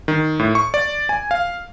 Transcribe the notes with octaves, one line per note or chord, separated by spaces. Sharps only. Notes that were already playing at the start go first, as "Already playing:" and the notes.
D#3
A2
C#6
D5
G#5
F5